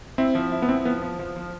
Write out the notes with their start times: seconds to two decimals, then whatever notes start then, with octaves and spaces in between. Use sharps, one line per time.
0.18 C4 E4
0.35 F3
0.52 E4
0.62 B3
0.69 C4 E4
0.85 F3 B3
1.02 F3
1.19 F3
1.36 F3